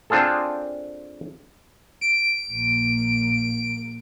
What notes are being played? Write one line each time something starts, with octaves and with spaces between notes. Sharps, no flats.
C4 D4 F4 G#4 A4
D7
A#1 A#3